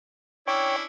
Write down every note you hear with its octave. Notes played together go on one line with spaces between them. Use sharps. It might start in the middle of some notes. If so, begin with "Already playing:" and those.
C#4 D4 E4 C#5 G5